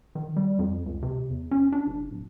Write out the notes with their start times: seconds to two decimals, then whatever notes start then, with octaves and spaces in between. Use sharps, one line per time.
0.15 D#3
0.36 G3
0.59 F2
0.86 C#2
1.02 C3
1.30 E2
1.51 C#4
1.72 D4
1.87 F#1
2.11 D1